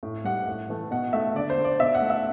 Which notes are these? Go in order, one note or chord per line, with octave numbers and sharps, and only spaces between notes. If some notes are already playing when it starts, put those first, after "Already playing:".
A2
G3 F#5
A2
E3 A3
B2 F#5
A3 E5
D3 D5
C5
A3
D5
B2 E5
F#5
A3
E5